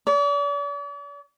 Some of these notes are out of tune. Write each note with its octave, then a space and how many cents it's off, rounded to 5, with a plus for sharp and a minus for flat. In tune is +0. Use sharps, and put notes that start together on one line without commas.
D5 -45